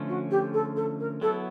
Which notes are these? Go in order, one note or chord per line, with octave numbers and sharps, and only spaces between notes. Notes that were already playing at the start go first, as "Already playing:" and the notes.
Already playing: D3 F3 A3 C#4
F#4
G4
A4
A4
A#4
F#3 B3 E4 A4